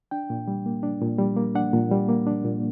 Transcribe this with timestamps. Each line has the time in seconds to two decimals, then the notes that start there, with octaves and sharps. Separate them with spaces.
0.11 D4 G5
0.30 A#2
0.47 G3
0.66 A#3
0.83 D4
1.01 A#2
1.19 G3
1.37 A#3
1.55 D4 F#5
1.73 A#2
1.91 G3
2.09 A#3
2.27 D4
2.45 A#2